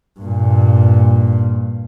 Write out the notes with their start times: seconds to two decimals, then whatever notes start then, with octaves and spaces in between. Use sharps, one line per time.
0.20 G2 A#2